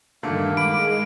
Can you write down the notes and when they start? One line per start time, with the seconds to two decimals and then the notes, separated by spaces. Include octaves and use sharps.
0.23 G2 A#2 D3 D#3 A3 A#3
0.57 G#3 B5 D6 D7